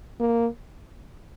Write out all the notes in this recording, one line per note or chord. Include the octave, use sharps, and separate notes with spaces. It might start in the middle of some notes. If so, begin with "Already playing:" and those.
A#3